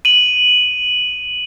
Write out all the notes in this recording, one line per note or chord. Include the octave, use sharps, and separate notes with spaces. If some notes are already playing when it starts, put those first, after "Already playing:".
D#7 F#7